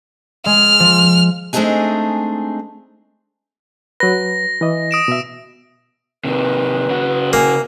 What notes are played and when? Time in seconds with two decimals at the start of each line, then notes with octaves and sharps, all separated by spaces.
0.46 G#3 F6
0.80 F3
1.53 G#3 A3 C4 D4 D#4 G#4
4.00 F#3 B4 A#6
4.61 E3 D#5
4.91 D#6 D7 E7
5.08 B2 E5
6.25 C3 D#3 B4
6.89 C#3 F#4
7.33 A#3 G#5